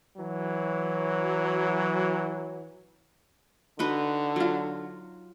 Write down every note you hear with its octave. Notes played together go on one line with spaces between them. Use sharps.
E3 F#3
D3 D#4 F#4 B4
F#3 F4